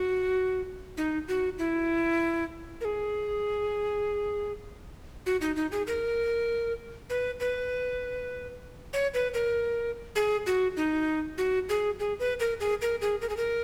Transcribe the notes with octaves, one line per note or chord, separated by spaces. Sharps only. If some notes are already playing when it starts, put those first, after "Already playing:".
Already playing: F#4
D#4
F#4
E4
A#4
G#4
F#4
D#4
D#4
G#4
A#4
B4
B4
C#5
B4
A#4
G#4
F#4
D#4
F#4
G#4
G#4
B4
A#4
G#4
A#4
G#4
A#4
G#4
A#4